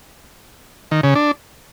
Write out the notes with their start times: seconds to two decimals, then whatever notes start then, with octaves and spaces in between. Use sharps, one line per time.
0.91 D#3
1.03 C#3
1.15 D4